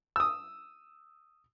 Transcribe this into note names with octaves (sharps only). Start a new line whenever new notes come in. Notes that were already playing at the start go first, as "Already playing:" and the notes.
D#6 E6